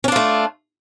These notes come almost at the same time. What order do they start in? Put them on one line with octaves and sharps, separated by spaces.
C#4 D4 F4 A3